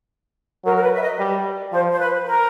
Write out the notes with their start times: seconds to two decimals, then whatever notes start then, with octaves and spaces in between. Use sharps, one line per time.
0.65 F#3 A#4
0.76 A#4
0.82 B4
0.95 E5
1.01 D#5
1.19 G3
1.72 F3 C5
1.91 C5
1.99 B4
2.25 A#4